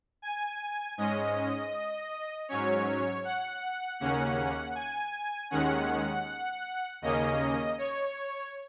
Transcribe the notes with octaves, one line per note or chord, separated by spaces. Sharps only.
G#5
G#2 G#3 C#4 D#5
G#2 F#3 C#4 C#5
F#5
D#2 C#3 A#3 C#4 F#5
G#5
D#2 D#3 G#3 C#4 F#5
D#2 C#3 A#3 C#4 D#5
C#5